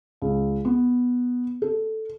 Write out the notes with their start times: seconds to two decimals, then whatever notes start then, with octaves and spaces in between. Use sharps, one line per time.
0.22 C#2
0.65 B3
1.62 A4